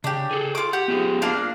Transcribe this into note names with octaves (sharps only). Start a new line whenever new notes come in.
C#3 D4 G4
G#4 A4
F4 D6
G4 F#5
B3 F4 G#4
A#3 D4 F5